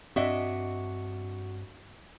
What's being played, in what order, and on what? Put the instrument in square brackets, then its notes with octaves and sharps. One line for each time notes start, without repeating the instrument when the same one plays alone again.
[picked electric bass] G2 C4 [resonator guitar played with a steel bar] D4 D#5 E5 [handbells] F#4 F#5